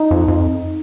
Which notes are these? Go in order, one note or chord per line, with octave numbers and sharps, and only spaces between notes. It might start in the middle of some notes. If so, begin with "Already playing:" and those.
Already playing: D#4
F2
F2